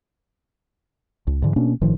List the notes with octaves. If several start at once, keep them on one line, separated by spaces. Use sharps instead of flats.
C#2
G#2 D3 E3
B2 A#3 C#4 D4
G1 A2 D#3 F3